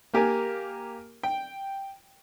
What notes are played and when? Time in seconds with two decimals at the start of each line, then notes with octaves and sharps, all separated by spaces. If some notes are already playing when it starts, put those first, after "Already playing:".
0.14 A#3 G4 A#4 G#5
1.23 G5